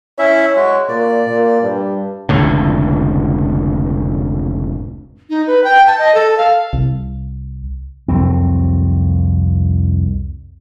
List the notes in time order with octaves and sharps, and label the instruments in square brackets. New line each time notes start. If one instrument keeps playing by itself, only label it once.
[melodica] C#4 E4 E5 [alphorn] C#5
[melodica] G#3 F#4
[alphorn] A#2 [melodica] D5
[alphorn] A#2
G2
[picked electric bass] F1 C#2 A2 D3
[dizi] D#4
B4
G5
A5
D#5
A4
F5
[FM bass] C2
[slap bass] C2 F2 F#3 C4